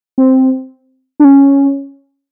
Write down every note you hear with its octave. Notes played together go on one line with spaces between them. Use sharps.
C4
D4
C#4